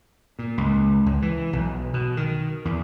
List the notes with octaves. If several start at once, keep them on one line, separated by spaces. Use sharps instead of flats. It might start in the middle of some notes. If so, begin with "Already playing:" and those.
A#2
C#2
C#2
E3
B1
B2
D#3
E2